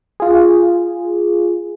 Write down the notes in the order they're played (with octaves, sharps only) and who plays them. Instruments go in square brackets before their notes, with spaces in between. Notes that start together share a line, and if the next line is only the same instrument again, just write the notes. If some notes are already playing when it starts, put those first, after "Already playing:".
[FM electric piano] F4 G#4